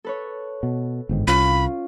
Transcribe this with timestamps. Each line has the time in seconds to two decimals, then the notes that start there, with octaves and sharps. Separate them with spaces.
0.04 A4 B4 C#5
0.63 B2
1.09 G1 G#2 D#3
1.27 C2 C#4 F4 B5